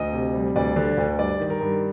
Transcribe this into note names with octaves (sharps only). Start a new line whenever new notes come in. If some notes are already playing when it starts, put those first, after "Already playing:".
Already playing: D2 D#5
C3
G3
D2 D5
D3
D2
G2 D5
D#3
A#4
G2